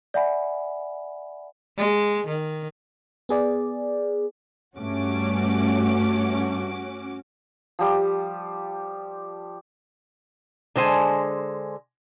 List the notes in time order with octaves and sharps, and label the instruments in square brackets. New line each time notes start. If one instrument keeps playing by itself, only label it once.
[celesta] D5 E5 F#5 G#5 B5
[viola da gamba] G#3
D#3
[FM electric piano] B3 G#4 D5
[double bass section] G2 A3 [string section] C#4 F#4 D6
[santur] F3 G3 G4
[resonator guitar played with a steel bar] D3 G#3 C5 G#5